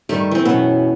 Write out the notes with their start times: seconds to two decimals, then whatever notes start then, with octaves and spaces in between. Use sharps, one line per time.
0.09 G2 D#3 A3 G4
0.31 E3 C4
0.45 F#2 B2 F#3 B3